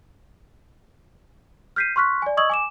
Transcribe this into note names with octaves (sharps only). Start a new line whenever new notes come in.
F6 G6 B6 C7 D#7
C6 C#6 F6 F#6 B6
D5 G#5
D#5 C#6 D#6 E6 G#6 F#7
G#5 D6 E7